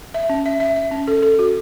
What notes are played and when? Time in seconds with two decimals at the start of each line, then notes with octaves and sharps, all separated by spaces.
0.14 E5
0.30 C#4
0.46 E5
0.60 E5
0.76 E5
0.91 C#4
1.08 A4
1.23 A4
1.39 F#4